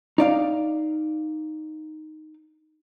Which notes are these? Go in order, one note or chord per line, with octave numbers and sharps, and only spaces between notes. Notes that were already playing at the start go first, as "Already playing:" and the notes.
D#4 D5 F5